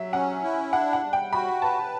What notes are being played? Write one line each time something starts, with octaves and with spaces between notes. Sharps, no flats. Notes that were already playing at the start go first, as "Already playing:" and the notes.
Already playing: F#3 E5
C#4 F#5
E4
D4 F#5
F#5
G3
G5
F#4 B5
B4 A5